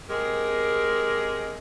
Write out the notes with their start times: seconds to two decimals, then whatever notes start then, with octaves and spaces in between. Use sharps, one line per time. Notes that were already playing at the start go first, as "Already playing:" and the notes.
0.09 G#3 C4 G4 G#4 A#4